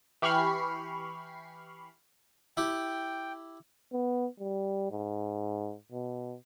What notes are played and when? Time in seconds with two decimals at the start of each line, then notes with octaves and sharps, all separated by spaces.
0.22 E3 G4 B5 C#6 F6 C7
2.57 E4 G4 G5
3.93 B3
4.40 G3
4.91 G#2
5.92 B2